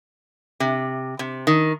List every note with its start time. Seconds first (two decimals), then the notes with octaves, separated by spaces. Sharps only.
0.60 C3
1.19 C3
1.47 D#3